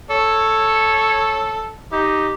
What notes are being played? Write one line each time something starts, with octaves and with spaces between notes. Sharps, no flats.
A4 C#5
D#4 G4